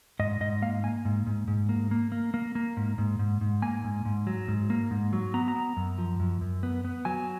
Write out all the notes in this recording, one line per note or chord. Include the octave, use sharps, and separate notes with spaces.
G#2 D#5
G#2 D#5
A#3 F5
A#3 G#5
G#2
G#2
G#2
A#3
A#3
A#3
A#3
A#3
G#2
G#2
G#2
G#2
A#3 G#5
G#2
G#2
F#3
G#2
A#3
G#2
F#3
B3 A#5
A#5
B3
F#2
F3
F#2
F#2
B3
B3
F#3 G#5